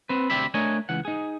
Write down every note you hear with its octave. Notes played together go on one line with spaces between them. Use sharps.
C4 B4
D2 C4 G4 D5 E5 B5
A3 D4 A#4 C#5 D#5 G#5
C#2 E3 F#5
D#4 G#4